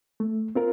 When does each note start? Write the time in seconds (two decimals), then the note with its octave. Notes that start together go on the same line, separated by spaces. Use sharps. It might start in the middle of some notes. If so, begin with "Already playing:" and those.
0.20 A3
0.55 C4 F4 A#4